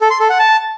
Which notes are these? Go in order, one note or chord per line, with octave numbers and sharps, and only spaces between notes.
A4
C6
A4
F#5
A5